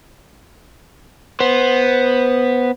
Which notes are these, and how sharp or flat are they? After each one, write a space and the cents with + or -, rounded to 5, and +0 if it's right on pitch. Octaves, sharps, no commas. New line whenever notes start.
B3 +0 C5 +10